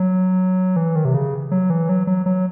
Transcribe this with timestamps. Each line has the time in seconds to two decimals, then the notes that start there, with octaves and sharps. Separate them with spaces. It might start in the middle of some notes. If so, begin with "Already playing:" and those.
Already playing: F#3
0.76 E3
0.96 D#3
1.05 C3
1.14 C#3
1.51 F#3
1.70 E3
1.89 F#3
2.07 F#3
2.26 F#3